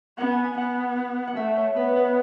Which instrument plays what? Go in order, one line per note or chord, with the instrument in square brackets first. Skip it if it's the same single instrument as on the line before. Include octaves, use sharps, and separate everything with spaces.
[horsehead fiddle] B3 [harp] F#5
[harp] G#5
G#5
[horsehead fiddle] B3 [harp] F#5
[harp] F#5
[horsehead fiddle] A3 [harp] E5
[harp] C#5
[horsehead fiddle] B3 [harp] B4
[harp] B4